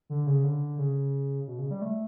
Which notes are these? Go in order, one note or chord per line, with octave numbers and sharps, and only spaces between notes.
D3
C#3
D3
C#3
B2
C#3
G3
A3